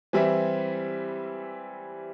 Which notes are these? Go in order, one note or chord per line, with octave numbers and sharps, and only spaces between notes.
E3 G3 C4 E4